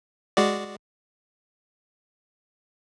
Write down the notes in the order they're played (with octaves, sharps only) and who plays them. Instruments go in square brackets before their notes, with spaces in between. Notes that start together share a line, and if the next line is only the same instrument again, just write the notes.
[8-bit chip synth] G#3 F#4 D5